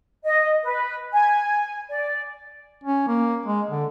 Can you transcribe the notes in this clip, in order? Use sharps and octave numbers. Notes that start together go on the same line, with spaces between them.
D#5
B4
G#5
D5
C#4
A#3
G#3
D3